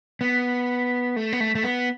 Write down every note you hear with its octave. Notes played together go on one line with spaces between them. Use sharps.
B3
A3
B3
A3
A3
B3